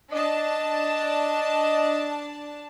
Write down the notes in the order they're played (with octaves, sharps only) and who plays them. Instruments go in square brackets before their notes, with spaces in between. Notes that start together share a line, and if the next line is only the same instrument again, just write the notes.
[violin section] D4 A5 [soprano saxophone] D#5